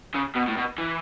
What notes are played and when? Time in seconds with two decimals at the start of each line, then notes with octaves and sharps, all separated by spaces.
0.15 C#3
0.36 B2
0.48 A2
0.57 B2
0.78 E3